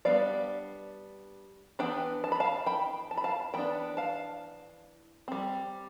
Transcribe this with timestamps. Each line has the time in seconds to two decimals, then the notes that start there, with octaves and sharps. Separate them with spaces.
0.05 G3 B3 D4 D5 F5
1.79 E3 B3 D4 G5
2.24 A5
2.32 B5
2.40 F5 A5
2.66 G5 B5
3.11 A5
3.17 B5
3.24 F5 A5
3.54 E3 B3 D4 G5 B5
3.97 F5 A5
5.28 G3 C4